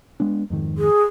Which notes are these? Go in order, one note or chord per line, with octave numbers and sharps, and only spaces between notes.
G#3 B3 D4
F2 G#2 D#3
G#4